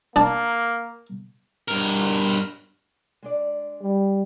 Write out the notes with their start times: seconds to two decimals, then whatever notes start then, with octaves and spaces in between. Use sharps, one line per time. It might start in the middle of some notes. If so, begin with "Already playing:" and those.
0.16 A#3 D4 A5
1.68 G2 A#4
3.23 G#3 D4 D5
3.82 G3